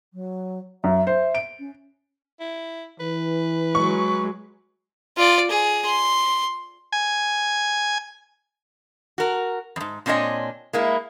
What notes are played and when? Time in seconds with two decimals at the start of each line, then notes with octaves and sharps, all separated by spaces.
0.13 F#3
0.84 F#2 E5
1.07 C5 E5
1.35 D7
1.59 C#4
2.40 E4
3.00 E3 B4
3.75 F#3 G#3 C#6
5.17 F4 D5
5.51 G#4
5.86 C6
6.93 G#5
9.18 F#4 A#4
9.76 F2 G#2
10.06 A#2 C4 D4 C#5 D#5 G#5
10.73 G#3 A#3 E4